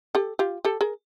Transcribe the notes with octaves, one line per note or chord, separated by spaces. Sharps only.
G4 A4
F4 G4
G4 A4
G#4 A#4